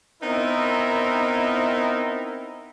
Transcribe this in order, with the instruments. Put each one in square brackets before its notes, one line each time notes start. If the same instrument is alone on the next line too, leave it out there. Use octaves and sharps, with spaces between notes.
[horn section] B3 C4 D#4 E4 A#4